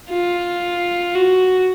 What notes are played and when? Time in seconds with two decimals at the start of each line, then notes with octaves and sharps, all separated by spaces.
0.11 F4
1.15 F#4